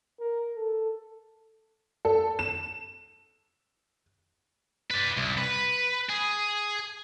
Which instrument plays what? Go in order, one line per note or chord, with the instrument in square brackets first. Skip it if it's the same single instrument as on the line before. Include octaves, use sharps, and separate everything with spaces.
[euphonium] A#4
A4
[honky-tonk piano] A4
E7
[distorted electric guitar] B4 D5
C2
B4
G#4